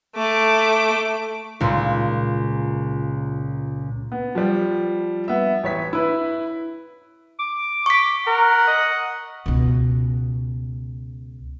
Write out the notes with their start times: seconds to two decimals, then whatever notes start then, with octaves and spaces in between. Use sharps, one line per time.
0.16 A3 D6
1.60 C#2 A#2
4.12 B3
4.35 F3 G3
5.28 B3 E5
5.63 A1 C#5 B6
5.93 E4 B4
7.39 D6
7.86 C#6 B6
8.27 A#4 F#5
8.67 D#5
9.46 C#2 B2